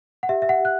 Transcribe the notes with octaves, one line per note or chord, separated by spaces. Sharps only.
F#5
G4 E5
E5
F#5
G4
F#6